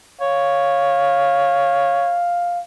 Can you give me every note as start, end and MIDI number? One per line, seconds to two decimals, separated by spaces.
0.21 2.20 73
0.21 2.61 77